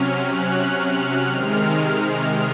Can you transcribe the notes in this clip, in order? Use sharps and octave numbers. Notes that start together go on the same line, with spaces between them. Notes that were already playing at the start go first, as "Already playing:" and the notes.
Already playing: C3 F#3 C#4 F6
F#6
F6
C3 D#3 G#3 F6